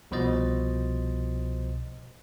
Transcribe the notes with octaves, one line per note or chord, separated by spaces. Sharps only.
C2 B2 F3 C5 D#5 A6